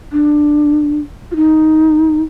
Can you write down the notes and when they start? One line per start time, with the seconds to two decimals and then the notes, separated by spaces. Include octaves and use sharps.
0.12 D4
1.31 F4
1.36 D#4